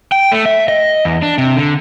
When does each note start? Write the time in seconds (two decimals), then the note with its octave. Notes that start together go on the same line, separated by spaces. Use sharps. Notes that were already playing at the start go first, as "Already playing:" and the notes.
0.12 G5
0.32 A3
0.45 E5
0.68 D#5
1.05 E2
1.22 D4
1.38 C3
1.57 D3